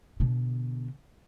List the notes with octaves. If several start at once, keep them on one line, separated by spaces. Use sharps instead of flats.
B2 D3